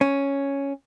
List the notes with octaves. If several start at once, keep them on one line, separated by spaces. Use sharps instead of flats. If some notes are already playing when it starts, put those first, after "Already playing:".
C#4